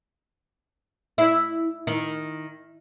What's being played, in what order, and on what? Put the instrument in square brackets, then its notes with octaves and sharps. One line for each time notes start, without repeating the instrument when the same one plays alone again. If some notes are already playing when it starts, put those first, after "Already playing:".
[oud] E4
D#3